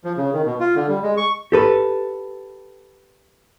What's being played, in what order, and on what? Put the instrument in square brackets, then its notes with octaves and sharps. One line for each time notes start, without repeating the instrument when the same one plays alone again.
[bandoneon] F3
C#3
D#3
B2
F4
D3
G3
G#3
C#6
[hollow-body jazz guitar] G4 A4 B4